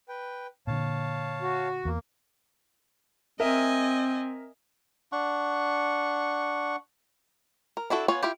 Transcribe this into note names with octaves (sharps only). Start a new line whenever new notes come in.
B4 G5
A#2 D3 C#5 F5 A5
F#4
E2 A#3
C4 A#4 D#5 E5 G#5
D4 F#5 C#6
A#4
D4 E4 F#4 A4
B3 F4 C#5 G#5
E4 F4 G4